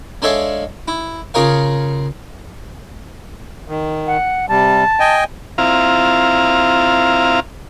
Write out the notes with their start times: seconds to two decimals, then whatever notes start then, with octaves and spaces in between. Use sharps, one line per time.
0.22 G#3 D4 A4 C#5 E5 F5
0.88 E4
1.34 C#3 F4 G#4 A#4 C#5 F5
3.68 D#3
4.07 F#5
4.49 C3 G3 A5
5.00 D#5 G5 G#5
5.58 C4 E4 F4 F5 A#5